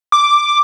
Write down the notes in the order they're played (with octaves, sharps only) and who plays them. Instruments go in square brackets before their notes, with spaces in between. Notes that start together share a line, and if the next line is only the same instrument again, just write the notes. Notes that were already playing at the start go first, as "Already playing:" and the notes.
[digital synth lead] D6